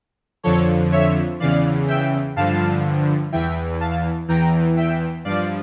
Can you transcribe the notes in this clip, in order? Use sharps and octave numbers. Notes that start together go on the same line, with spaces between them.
F2 D3 F3 A4 C#5
C#5 E5
E2 C#3 E3 D5 F5
E5 G5
G2 D3 F3 F5 A5
E2 E3 E5 G5
F5 A5
E2 E3 G5 A#5
E5 G5
G2 F3 D5 F5